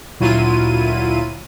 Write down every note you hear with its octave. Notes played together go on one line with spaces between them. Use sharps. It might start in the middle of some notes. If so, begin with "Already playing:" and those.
D2 A#2 F#3 E4 F4 D#7